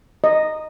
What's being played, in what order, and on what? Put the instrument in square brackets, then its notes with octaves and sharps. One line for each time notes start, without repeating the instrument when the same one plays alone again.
[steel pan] D#5